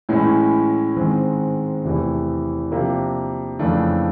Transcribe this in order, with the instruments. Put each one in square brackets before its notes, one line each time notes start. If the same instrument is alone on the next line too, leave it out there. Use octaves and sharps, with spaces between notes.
[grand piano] A2 E3 G#3 C#4 E4
G#2 D#3 G#3 C4
E2 C3 E3 A3
C3 F3 A#3 D4
F2 C#3 E3 A3 D4